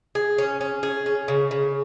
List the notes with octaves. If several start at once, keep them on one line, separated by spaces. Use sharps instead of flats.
G#4
C#4
C#4
G#4
C#4
C#3
C#3